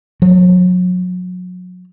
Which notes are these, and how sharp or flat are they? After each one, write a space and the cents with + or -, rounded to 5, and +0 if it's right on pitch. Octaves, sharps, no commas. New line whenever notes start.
F#3 -35